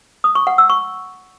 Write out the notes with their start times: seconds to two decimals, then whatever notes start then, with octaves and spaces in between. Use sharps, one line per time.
0.24 D#6
0.35 C#6
0.47 F#5
0.58 E6
0.70 C#6